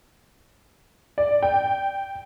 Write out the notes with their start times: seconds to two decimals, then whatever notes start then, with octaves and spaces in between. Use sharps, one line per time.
1.18 D5
1.43 G5